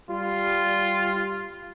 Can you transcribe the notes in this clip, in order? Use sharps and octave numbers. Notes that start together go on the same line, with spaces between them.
G3 F4